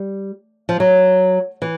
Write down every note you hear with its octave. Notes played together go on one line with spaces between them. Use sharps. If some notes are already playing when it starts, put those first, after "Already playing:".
Already playing: G3
F3
F#3
E3